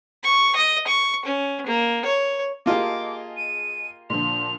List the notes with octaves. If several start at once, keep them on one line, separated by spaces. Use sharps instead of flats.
C#6
D#5
C#6
C#4
A#3
C#5
A#3 F4 G4 G#4 D#5 A5 D6
D#7
A#2 D3 F3 F7